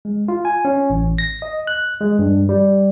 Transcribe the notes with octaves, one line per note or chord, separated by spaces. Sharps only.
G#3
F4
G#5
C#4
A1
A#6
D#5
F#6
G#3
G2
G3